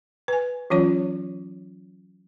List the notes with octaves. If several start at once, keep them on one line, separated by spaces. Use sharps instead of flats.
B4 G#5
E3 F#3 C#4 F4 C#5